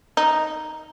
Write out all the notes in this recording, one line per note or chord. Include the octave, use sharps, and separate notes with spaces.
D#4